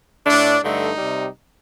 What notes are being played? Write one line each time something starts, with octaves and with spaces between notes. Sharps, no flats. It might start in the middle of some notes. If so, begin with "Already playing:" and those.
A2 A3 D4
G2 D3 A3 D#4
C3 G3